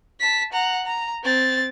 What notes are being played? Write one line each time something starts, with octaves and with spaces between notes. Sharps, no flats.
A5 B6
F#5 A#5
A#5
C4 A6